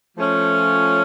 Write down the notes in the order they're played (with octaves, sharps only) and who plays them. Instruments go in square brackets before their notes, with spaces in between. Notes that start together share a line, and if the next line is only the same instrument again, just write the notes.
[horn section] F3 A3 C#4